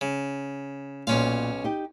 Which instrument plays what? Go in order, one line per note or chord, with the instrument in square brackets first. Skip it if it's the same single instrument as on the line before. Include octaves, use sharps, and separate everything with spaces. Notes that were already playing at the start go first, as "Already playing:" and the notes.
[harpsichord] C#3
[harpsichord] B1 C#4 F5 [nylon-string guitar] A#2
[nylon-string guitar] D#4 G4